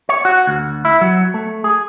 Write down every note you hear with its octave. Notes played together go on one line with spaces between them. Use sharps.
C#5
F#4
D2
E4
F#3
A3
G#4